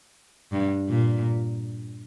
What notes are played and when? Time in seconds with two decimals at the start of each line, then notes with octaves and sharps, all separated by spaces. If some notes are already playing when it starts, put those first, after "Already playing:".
0.53 G2
0.89 A#2